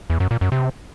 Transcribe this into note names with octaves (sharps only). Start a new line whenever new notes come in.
E2
F#2
A#2
F#2
C3